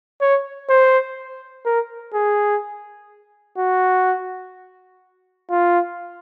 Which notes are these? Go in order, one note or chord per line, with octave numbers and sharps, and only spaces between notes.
C#5
C5
A#4
G#4
F#4
F4